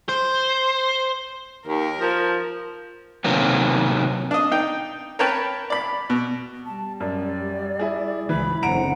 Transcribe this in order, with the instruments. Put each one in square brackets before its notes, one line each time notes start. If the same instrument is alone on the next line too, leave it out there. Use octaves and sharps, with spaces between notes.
[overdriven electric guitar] C5
[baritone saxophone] D#2 [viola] A#4
[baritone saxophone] F3
[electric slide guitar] C3 D#3 F#3 A#3 B3
[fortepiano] D4 D#5
D#4 G5
A#4 B4 C#5 G5 A5 B5
D5 B5
B2
[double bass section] G3 [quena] A5
[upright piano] F#2 [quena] D5
[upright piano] E4 G#4
[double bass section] C#2 G#2 [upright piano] E3 [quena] B5
[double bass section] F#1 D3 C4 [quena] F#5 [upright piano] A#5 D7